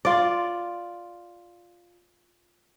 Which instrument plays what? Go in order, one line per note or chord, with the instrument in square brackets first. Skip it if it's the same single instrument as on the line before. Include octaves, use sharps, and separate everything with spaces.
[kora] F4 D5